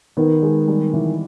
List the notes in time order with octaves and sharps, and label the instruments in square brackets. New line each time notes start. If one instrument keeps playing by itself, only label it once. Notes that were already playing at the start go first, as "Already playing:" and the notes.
[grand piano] D#3 [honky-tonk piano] B3
[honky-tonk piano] G#3
G3
E3